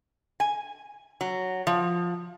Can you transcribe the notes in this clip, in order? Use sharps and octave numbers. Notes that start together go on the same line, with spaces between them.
G#5
F#3
F3